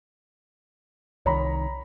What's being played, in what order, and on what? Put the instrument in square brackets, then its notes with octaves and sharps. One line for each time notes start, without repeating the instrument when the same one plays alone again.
[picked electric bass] C2 D#3 [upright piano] C#5 A#5 B5